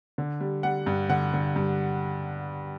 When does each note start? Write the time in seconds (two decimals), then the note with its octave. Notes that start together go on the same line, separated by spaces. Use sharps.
0.18 D3
0.41 G3
0.63 G3 F#5
0.86 G2
1.09 D3 F#5
1.33 D3
1.56 G2